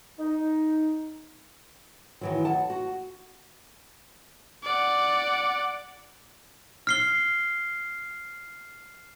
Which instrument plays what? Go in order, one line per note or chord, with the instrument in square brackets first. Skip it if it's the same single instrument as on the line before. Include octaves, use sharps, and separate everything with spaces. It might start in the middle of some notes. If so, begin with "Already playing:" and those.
[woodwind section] D#4
[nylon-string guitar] D#3 E3 F#3
F#5 A5
F#4
[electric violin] D5 F#5
[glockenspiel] F6 C7 G7